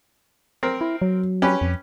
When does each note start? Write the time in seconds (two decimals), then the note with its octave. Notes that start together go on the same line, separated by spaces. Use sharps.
0.63 C4 A#4
0.81 E4
1.02 F#3
1.42 C#4 G4 B4
1.61 F2